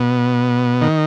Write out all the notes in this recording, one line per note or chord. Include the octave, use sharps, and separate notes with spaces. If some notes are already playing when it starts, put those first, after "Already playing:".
Already playing: B2
D#3